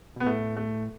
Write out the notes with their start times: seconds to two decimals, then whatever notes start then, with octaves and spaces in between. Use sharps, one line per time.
0.16 B2 B3
0.26 A2 A3
0.57 A3